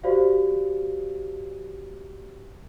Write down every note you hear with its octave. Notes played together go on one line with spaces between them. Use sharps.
F#4 G4 C5 D5 F5